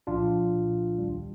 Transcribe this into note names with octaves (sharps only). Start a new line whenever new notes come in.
C2 A#2 F3 D4 F4
C2 A#2 F3
D#2 D#3 G3